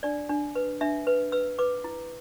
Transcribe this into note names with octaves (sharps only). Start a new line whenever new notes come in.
D4 D5
D4
B4
D4 E5
B4
B4 E6
B4 D6
E4